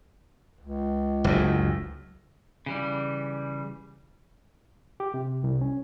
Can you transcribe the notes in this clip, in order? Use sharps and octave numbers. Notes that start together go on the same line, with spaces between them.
C#2
F#1 D2 A2
C#3 E3 G3
G4
C3
C2
C#4